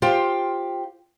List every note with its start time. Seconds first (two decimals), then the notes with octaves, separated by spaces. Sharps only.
0.02 F4 G4 C5 F5 G5